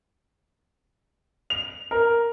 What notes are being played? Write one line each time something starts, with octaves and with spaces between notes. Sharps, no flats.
F7
A#4